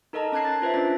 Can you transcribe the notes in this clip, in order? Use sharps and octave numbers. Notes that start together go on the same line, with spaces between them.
D#4 A4 A#4 D#5 A5 A#5
C#4 A5 F#6 G#6 C7
A6
F4 B4 C5 E5
C#4 D4 F4 A6